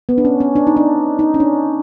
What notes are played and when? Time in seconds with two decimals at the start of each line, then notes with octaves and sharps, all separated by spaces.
0.09 B3
0.18 D4
0.25 C#4
0.40 C#4
0.56 D4
0.67 D#4
0.77 D4
1.19 D#4
1.34 C#4
1.40 D4